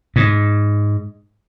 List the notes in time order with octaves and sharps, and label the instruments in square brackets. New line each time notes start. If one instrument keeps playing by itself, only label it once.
[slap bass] G#2